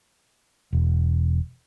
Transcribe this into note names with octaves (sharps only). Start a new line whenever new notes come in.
E1